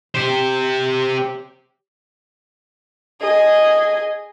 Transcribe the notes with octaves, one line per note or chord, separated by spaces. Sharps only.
G4 C5
G#4 D#5